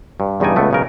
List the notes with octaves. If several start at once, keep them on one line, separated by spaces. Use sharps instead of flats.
G2
E2 G2 C#3 D#4 D5 G#5
C#2 A3 B3
B1 C#3 A#4